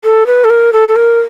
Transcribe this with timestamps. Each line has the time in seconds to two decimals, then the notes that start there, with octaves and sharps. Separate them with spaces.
0.04 A4
0.26 B4
0.44 A4
0.50 A#4
0.73 A4
0.88 A4
0.96 A#4